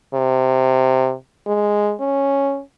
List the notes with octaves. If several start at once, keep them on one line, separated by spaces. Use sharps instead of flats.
C3
G#3
C#4